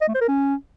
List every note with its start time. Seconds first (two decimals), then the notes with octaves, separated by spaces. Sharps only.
0.01 D#5
0.08 A3
0.15 C5
0.21 A#4
0.28 C#4